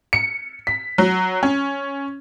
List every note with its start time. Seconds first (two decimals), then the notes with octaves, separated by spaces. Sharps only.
0.13 C#7
0.67 B6
0.98 F#3
1.43 C#4